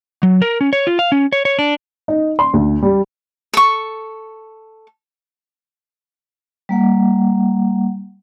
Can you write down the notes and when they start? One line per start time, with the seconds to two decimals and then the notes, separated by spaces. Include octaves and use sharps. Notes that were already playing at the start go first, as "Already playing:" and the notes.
0.23 F#3
0.42 A#4
0.61 C#4
0.73 C#5
0.87 F4
0.99 F5
1.12 C#4
1.33 C#5
1.45 C#5
1.59 D4
2.08 D#4
2.39 C6
2.53 D2
2.82 G3
3.54 A4 C#6
6.69 G3 A#3 F#5